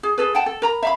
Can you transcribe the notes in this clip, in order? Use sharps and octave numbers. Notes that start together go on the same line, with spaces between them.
G#4
G#4 A4 B4
F#5 G5 A5
A4
A#4 A#5 B5
E5 F5 B5